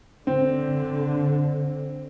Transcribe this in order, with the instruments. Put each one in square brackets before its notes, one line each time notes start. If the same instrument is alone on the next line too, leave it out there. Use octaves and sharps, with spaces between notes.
[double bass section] D3 [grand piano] C4